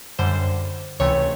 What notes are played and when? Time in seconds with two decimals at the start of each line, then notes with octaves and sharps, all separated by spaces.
0.19 F#2 D3 G3 C5
1.00 C#2 C3 E3 A3 C#5